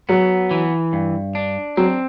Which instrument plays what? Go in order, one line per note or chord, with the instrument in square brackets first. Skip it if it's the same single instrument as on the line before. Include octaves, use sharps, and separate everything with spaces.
[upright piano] F#3 [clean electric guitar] B3
[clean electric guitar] E3
G2
D4
[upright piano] F#3 [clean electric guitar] C4